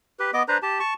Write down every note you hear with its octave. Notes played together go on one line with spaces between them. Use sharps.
G4 B4
B3 D#5 D6
D4 B4 C5 A#5
G4 A5
A5 C#6